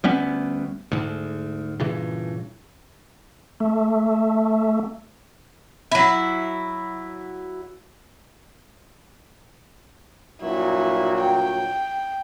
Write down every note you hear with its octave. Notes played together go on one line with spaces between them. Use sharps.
D2 G3 B3 C#4
D2 G#2
G2 A#2 C#3 E3
A3
F#3 E4
G2 A#2 F#3 E4
G5